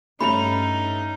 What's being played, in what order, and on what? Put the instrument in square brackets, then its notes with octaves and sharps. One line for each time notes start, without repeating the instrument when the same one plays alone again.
[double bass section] G2 [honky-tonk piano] A3 C#4 F7 [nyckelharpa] D#4 [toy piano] B5